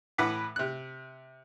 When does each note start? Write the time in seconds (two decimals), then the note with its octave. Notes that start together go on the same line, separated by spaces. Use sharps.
0.18 A2 E3 B4 F#5 B5 D6
0.56 C3 F#6